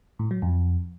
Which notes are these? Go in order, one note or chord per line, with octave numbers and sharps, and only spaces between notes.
A2
F#3
F2